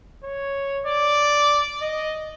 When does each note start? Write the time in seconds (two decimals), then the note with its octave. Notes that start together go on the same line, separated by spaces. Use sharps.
0.24 C#5
0.86 D5
1.82 D#5